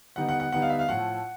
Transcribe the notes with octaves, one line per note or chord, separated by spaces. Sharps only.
D3 G3 B3 D#4 F#5
F#5
F#5
D3 G3 B3 D#4 F#5
F5
E5
F5
A2 F3 A3 F#5